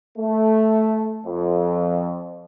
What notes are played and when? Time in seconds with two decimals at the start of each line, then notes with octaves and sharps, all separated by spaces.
0.18 A3
1.25 F2